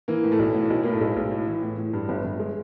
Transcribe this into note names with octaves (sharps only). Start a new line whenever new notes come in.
E3 A#3
A2
A3
B1
A2
B1
A2 A#3
A3
B1 G#3
B1
A2
E3
A2
A2
G2
G1
G1
G#3